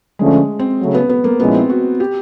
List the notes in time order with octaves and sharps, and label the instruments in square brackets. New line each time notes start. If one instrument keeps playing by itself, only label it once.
[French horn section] D3 F3 A3 C#4 [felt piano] G#3
[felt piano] C4
[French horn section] C#3 F#3 A3
[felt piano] B3
B3
A#3
[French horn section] A#2 F3 G#3 C#4 E4 [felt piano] B3
[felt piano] C4
F#4
G4